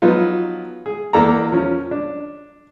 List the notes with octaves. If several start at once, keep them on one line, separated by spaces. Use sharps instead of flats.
F3 F#3 B3 D#4 F4
G#4
E2 A#3 A4 D5 A#5
F3 C#4
D4